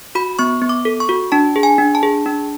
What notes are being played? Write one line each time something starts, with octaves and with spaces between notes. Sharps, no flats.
F#4 B5
B3 C#6
B3
D6
A4
C#6
F#4
D4 A5
G#4
G#5
D4
A5
G#4
D4